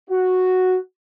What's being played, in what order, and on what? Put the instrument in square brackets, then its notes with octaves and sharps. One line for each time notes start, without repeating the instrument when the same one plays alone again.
[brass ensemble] F#4